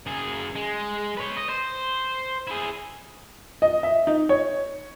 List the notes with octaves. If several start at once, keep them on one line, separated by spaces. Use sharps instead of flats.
F#2 G#4
G#3
B4 C#5
D#5
C5
E4 G#4
D#5
E5
D#4
C#5